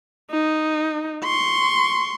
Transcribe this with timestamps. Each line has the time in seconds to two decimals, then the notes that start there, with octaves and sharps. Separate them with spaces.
0.31 D#4
1.24 C6 C#6